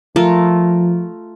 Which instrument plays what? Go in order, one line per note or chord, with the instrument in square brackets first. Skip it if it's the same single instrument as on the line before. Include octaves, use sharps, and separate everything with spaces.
[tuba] F3 [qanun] A3 F4 A#4